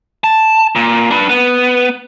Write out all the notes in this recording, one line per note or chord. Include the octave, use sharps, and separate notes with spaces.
A5
A#2
D4 B4
B3